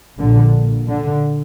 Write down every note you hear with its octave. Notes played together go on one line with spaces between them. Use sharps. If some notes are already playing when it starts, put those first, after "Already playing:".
A#1 A#2 D3
D3